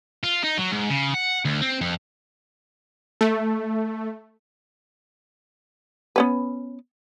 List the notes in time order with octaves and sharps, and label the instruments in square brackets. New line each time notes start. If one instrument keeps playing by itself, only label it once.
[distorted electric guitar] F4
D#4
F#3
G#2
C#3
F#5
D2
C4
F2
[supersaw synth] A3
[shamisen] B3 C#4 B4